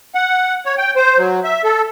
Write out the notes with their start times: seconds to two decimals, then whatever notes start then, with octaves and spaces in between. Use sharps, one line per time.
0.15 F#5
0.66 C#5
0.78 G5
0.96 C5
1.18 F#3
1.44 E5
1.64 A4